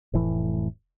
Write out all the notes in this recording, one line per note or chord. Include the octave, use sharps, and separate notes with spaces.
F1 A2 E3 A3